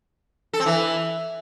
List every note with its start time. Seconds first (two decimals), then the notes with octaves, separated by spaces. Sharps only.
0.53 A4
0.60 C4
0.66 E3